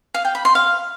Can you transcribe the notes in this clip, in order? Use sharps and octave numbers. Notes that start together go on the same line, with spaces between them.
F5
G5
B5
C6
F5